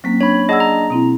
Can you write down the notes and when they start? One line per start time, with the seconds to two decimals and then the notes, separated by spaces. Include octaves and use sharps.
0.04 F#3 A#3 C4 C#4 B6
0.21 D4 C#5 B5
0.49 D4 G#4 D#5 F#5 E6
0.60 A#5
0.90 B2 C4 E4